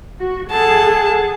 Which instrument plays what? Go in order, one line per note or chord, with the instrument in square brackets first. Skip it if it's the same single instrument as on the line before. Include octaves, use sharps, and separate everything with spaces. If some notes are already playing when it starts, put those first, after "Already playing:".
[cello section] F#4
[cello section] G#4 [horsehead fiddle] A4 F#5 [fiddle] A5